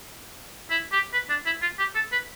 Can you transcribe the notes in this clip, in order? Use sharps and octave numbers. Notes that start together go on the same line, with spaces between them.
E4
G4
B4
D4
E4
F4
G4
A4
B4